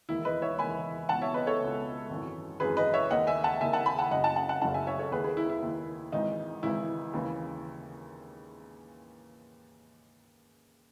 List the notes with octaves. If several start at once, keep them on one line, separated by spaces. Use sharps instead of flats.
E1 D#2 D#3 E4
B4 D#5
C#5 E5
E1 D#2 D#3 G#5 B5
C#2 B2 F#5 A5
C#5 E5
B4 D#5
A4 C#5
C#2 B2
G#1 F#2 E3
G#1 F#2 E3 G#4 B4
B4 D#5
C#5 E5
D#2 D#3 D#5 F#5
E5 G#5
F#5 A5
D#2 D#3 E5 G#5
F#5 A5
G#5 B5
F#5 A5
F#1 F#2 C#3 D#5 F#5
F#5 A5
F#5 A5
F#5 A5
F#1 F#2 C#3 F#5 A5
E5 G#5
C#5 E5
A4 C#5
D#2 D#3 G#4 B4
G#4 B4
E4
E4
D#2 D#3
G#1 G#2 E3 D#4
G#1 G#2 E3 E4
D#2 C#3 E3